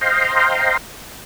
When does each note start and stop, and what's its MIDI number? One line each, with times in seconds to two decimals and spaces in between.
0.01 0.77 72
0.01 0.77 75
0.01 0.77 77
0.01 0.77 79
0.01 0.77 82
0.01 0.77 84